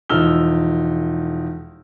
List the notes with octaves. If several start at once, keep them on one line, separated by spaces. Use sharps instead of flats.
E1 F3 D#4 E6 F6 G7